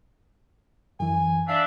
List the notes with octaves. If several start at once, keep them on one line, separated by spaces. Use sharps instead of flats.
F#2 E3 G#5
D4 E5 F5